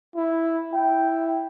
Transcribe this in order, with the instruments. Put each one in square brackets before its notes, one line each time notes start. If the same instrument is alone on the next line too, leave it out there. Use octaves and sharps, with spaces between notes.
[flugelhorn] E4
[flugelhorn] E4 [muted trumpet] G5